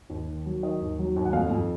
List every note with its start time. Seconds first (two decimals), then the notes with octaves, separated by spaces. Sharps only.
0.10 D#2
0.28 D#3
0.46 F#3
0.63 D#3 D#5
0.81 D#2
0.99 F#3
1.16 D#2
1.25 F#5
1.33 F2 F5
1.51 F2